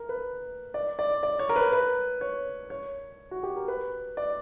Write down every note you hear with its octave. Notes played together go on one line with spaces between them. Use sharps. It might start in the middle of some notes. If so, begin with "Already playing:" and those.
Already playing: A#4
B4
D5
D5
D5
C#5
A#4
B4
B4
C#5
C#5
F#4
G4
A#4
B4
D5